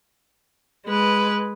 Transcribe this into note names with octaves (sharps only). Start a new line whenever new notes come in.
G#3 B4